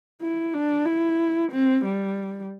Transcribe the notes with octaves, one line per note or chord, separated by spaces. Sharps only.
E4
D4
E4
C4
G3